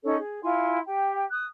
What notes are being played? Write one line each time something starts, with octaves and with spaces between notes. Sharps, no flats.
C#4 D#4 A4 C#5
G#4
E4 F4 G#5 C6
G4 G5
D#6 F#6